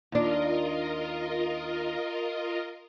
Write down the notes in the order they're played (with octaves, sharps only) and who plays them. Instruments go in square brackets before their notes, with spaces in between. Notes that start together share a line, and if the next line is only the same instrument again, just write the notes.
[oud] D#2 D4 [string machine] F4 A#4 D#5